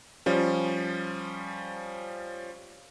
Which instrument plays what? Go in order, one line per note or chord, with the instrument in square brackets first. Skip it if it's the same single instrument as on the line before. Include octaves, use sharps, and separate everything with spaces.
[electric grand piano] F3 G3 C#4